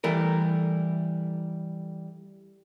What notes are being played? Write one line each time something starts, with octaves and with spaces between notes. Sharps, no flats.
E3 G3 A3 A#4